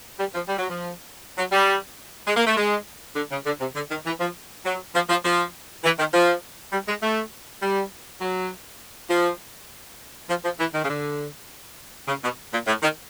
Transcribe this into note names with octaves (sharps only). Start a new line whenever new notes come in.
G3
F3
G3
F#3
F3
F#3
G3
G#3
A#3
A3
G#3
D3
C#3
D3
C3
D3
D#3
E3
F3
F#3
F3
F3
F3
E3
D#3
F3
G3
G#3
A3
G3
F#3
F3
F3
F3
E3
D#3
C#3
D3
C#3
B2
A#2
A2
D#3